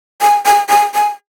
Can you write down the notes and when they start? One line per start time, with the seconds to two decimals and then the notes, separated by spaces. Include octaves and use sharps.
0.22 G#5
0.46 G#5
0.69 G#5
0.95 G#5